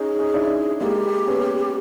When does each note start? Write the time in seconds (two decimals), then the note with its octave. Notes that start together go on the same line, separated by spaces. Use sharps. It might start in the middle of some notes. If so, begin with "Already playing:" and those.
Already playing: C#4 D#4 G#4
0.19 C#4 D#4
0.34 D4 E4
0.80 G#3 A#3 G4
1.27 B3 C#4